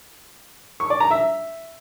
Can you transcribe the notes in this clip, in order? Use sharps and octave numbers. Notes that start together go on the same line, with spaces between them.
C#6
D5
A#5
E5